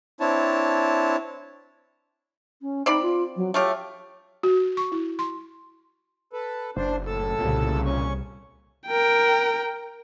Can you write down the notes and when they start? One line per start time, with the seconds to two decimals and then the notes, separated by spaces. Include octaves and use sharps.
0.20 C4 D4 E4 C#5 A5
2.61 C#4
2.86 C4 D#4 D5 B5
3.02 F4
3.36 F#3
3.54 A3 F4 G4 C#5
4.43 F#4
4.77 C#6
4.92 E4
5.19 C6
6.33 A4 B4
6.77 F#1 D4 C5
7.06 A2 A4 E6
7.39 C2 A#2 C#3
7.86 C#4 C#6
8.87 A#4 G5